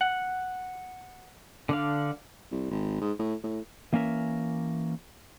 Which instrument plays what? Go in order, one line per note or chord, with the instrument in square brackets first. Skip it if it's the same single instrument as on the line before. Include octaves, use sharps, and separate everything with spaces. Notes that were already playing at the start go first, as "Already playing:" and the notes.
[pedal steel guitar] F#5
D3 D4 F5
[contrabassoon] C2
G#1
G#2
A2
A2
[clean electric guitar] E3 A#3 C#4 A#4 E5